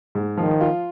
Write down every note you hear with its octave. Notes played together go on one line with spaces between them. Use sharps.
G#2
D#3 F3
F4